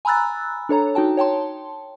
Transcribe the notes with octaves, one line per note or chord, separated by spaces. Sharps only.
G#5 A#5 B5 E6 F#6 A6
D4 A4 C#5 A#5
D#4 F#4 G5 A5
C#5 G5 A5 C6